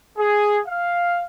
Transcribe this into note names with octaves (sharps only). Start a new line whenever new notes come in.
G#4
F5